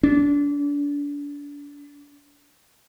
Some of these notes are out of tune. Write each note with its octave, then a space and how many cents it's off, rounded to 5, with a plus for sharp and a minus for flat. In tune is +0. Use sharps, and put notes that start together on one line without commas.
D4 -30